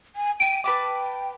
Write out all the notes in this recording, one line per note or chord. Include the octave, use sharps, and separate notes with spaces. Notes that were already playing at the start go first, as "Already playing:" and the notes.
G#5
G5 D7 D#7
B4 G5 A5 D6